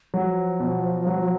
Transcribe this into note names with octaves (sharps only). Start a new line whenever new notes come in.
F3 F#3
B2
F#3